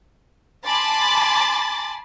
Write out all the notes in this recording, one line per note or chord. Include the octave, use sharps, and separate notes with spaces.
G#5 A5 B5 C6 D6 A6